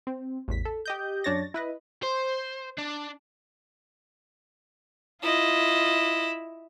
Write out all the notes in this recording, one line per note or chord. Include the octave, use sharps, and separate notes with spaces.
C4
A1 E2 B6
A4
G4 D#5 G6
F#2 D4 C#5 A6 A#6
E4 B4 D#5
C5
D4
E4 F4 D#5